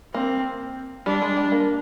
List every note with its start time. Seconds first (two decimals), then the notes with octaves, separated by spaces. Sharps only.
0.14 A#3 C4
1.06 G3 D4
1.22 G#3
1.37 G3
1.52 A#3